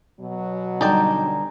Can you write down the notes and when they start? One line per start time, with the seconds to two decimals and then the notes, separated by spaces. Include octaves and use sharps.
0.20 B2 F#3
0.81 D3 G3 D#4 D5 G5 G#5 A#5